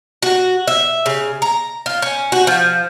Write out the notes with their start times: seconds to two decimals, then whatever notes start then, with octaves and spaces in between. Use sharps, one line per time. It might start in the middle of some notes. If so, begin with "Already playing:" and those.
0.23 F#4
0.67 E5
1.06 C#3
1.42 A#5
1.86 F4
2.02 C#4
2.32 F#4
2.47 F3